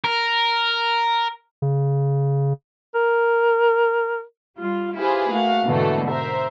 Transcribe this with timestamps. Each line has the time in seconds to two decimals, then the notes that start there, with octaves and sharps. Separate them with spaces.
0.04 A#4
1.62 C#3
2.95 A#4
4.58 G3 F4
4.99 E4 F4 G4 G#4 B4 C5
5.32 A3 A#3 F#4 F5
5.66 G#2 B2 D3 E3 F#3 A3
6.09 A#4 C5 E5